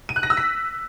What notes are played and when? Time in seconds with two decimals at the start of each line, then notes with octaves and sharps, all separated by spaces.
0.09 D#7
0.16 F#6
0.23 A#6
0.30 E6
0.37 B6